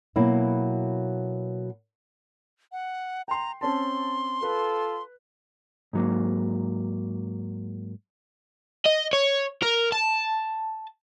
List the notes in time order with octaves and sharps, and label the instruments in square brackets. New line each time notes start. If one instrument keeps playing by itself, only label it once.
[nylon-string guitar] B2 F#3 A#3 E4
[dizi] F#5
[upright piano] G5 C6 [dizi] A#5
[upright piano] C4 C#4 A5 [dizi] C6
[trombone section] F4 A4 [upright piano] B4
[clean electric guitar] G#2 F#3 A#3
[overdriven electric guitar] D#5
C#5
A#4
A5